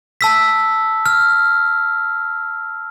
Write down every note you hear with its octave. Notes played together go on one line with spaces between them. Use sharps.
A5 E6 B6
F6